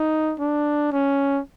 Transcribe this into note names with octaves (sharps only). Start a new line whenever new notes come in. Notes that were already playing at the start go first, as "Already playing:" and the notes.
Already playing: D#4
D4
C#4